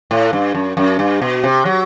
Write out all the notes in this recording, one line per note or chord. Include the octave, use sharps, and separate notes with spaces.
A2
G2
F#2
F#2
G2
B2
C3
F#3